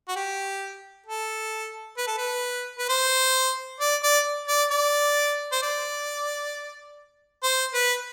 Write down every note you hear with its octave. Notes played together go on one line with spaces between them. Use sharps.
F#4
G4
A4
B4
A4
B4
B4
C5
D5
D5
D5
D5
C5
D5
C5
B4